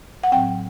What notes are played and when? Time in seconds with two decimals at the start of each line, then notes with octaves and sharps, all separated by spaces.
0.24 F#5
0.32 A2 F#3 C4 G5